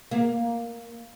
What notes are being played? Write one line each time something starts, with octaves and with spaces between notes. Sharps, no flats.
A#3